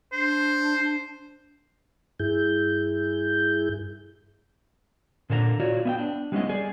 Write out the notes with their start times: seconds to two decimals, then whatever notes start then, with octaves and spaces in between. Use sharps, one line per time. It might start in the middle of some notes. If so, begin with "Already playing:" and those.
0.13 D4 C5
2.20 G2 E4 G#4 G6
5.30 A#2 D3 D4 C5 A#5
5.60 F4 F#4 C#5 D5
5.85 B3 E5 G5
5.98 D4
6.32 G3 G#3 B3 C#4 E4 D#5
6.49 G#4 D5